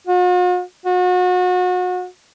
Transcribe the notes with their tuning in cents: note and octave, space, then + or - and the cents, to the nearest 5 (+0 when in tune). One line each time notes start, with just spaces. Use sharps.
F#4 -45
F#4 -35